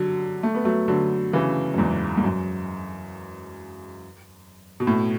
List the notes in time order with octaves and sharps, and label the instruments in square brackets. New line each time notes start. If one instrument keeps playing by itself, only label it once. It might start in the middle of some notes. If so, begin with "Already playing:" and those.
Already playing: [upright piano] D3 F#3
A3
B3
F#3 A3
D3 F#3
C#3 E3
F#2
E2 G#2
G#2
F#2
B2
A2